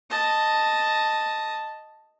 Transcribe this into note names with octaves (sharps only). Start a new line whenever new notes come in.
D#5 A5